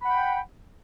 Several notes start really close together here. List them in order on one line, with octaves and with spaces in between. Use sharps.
B5 F#5 G5